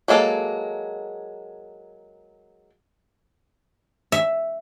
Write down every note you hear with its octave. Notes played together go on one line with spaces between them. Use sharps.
F#3 G#3 A#3 A4
E5